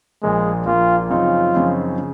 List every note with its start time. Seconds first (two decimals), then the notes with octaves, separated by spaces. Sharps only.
0.23 A#1 A#2 F3 G#3 A#3
0.66 A#1 A#2 F3 A#3 F4
1.10 F#2 C#3 F3 C4 D#4 F4
1.53 F#2 C#3 F3 C4 D#4
1.98 C#3